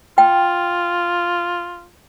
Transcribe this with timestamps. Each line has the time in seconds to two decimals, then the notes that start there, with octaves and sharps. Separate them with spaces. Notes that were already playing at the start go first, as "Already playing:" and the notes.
0.18 F4 G5